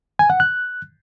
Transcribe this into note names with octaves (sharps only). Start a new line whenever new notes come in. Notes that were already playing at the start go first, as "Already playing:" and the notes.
G#5
F#5
F#6